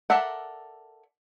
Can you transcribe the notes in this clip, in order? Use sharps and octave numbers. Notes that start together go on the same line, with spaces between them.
A4 A#4 D5 E5 F#5